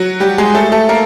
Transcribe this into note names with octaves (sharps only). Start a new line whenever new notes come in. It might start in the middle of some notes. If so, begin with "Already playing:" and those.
Already playing: F#3 F#4
G3 G4
G#3 G#4
A3 A4
A3 A4
A#3 A#4